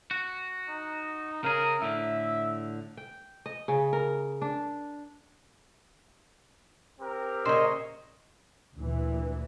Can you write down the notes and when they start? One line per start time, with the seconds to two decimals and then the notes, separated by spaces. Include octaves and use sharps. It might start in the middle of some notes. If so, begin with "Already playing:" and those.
0.11 F#4
0.69 D#4
1.44 C#3 G#4 A#4
1.82 A2 D3 E5
2.97 G5
3.46 D#5
3.68 C#3
3.93 A#4
4.42 D4
7.00 C4 G4 A#4
7.45 A#2 C#3 A#3 C5 C#5 D#5
8.76 D2 A#2 E3